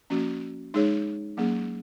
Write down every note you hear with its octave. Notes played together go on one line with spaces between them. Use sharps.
F3 A#3 C#4 F#4
G#3 D#4 G#4 C#5
F#3 A#3 C#4 G#4